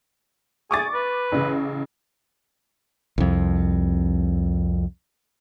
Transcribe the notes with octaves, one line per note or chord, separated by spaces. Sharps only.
G#4 C#6 D6 A6
B4
A1 C#3
C2 F2